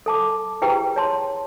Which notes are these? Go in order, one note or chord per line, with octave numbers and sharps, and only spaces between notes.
A4 A5 D6
E4 G4 G#4 B4 G5 A#5
C#5 A5 C6